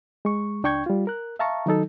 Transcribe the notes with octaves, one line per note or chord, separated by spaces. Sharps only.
G#3 C#6
C#2 D4 G5 C#6 G6 G#6
G3 F4
A#4 F#6
E5 F5 A5 A#5 C#6
D#3 F#3 D#4 A4